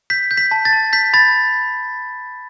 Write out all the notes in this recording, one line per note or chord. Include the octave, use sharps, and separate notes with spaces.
G6 B6
G6
B6
A5
A6
A5
G6 B6
B5 A6